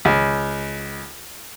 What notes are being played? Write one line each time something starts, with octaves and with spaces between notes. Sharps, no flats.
C#2